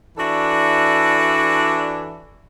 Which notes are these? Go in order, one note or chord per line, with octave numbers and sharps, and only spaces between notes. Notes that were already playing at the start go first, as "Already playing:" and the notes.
E3 D4 F#4 A4 D5 E5